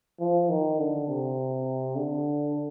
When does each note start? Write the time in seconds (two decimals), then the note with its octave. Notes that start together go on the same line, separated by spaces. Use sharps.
0.20 F3
0.49 D#3
0.79 D3
1.08 C3
1.96 D3